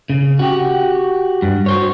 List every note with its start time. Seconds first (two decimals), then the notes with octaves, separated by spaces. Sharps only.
0.10 C#3
0.39 F#4 G4
1.42 G2
1.66 F#4 C5 C#5